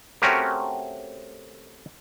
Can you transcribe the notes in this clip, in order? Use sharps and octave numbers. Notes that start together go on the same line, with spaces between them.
A3 C4 C#4 F#4 G4 A#4